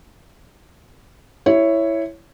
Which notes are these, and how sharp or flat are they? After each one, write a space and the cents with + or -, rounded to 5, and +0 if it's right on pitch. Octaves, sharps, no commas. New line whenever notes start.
E4 +5 C#5 +0